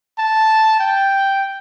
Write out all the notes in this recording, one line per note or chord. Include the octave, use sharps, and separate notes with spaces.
A5
G5